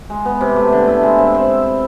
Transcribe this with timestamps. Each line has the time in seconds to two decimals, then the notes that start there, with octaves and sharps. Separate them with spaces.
0.10 G#3
0.25 B3
0.41 C3
0.56 A3
0.72 D3
0.88 E4
1.03 G#3
1.18 C4
1.34 C4